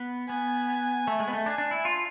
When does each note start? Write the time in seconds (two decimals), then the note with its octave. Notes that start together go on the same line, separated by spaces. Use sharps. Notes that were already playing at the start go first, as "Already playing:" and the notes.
Already playing: B3
0.29 B3 G#5
1.08 A3
1.20 G#3
1.28 B3
1.33 A3
1.46 D4 G#5
1.58 D4
1.71 E4
1.85 F4